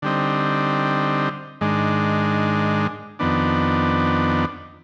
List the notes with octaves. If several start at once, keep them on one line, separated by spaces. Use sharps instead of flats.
D3 G3 C4 D#4
G#2 D#3 G#3 D4
F2 D#3 B3 D4